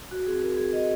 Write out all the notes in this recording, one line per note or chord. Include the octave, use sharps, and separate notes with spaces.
F#4
C4 G#4
F#4 A#4
C4 G#4
F#4 D#5